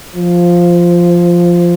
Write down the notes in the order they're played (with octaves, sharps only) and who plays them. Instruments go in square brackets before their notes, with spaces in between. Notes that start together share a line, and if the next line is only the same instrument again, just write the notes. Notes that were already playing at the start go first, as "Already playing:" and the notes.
[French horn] F3